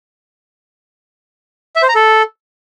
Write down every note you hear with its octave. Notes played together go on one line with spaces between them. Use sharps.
E5
C5
A#5
A4